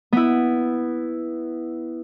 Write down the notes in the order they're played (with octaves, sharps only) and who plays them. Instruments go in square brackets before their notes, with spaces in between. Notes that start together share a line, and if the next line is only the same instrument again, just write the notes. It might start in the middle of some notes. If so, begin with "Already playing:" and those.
[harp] B3 E4